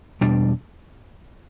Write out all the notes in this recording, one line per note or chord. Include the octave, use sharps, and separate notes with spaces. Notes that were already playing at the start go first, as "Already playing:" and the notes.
E2 B2 G3 D4